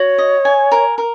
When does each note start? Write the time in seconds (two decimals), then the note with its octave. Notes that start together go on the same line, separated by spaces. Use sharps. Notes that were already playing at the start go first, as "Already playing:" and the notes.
Already playing: F#4 C#5
0.18 D#5
0.45 G#5
0.72 A#4
0.98 A#4